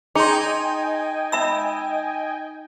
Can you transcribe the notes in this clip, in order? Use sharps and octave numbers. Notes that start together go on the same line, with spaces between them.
D#4 G#4 D#5 G5 G#5 C6
E5 B5 E6